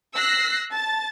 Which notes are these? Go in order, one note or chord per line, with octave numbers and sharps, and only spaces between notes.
E6 F#6 A#6 C7
A5 A6